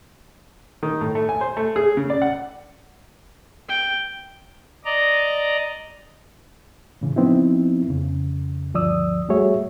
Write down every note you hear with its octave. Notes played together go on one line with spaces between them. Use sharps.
D#3
A2
A3
G#5
C5
A3
G#4
C#3
D5
F#5
G5
D5 D#5 A#5
A2 C#3 E3
F3 B3 C4 D#4 E4
F2 C#3
D2 G2 F3 D5 D#6 E6
G3 A3 F#4 G#4 C#5 E5